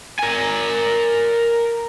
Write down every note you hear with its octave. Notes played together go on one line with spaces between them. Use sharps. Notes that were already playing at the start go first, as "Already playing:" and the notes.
A#4 G#5